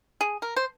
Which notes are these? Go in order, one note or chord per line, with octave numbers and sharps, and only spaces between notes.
G#4
A#4
C5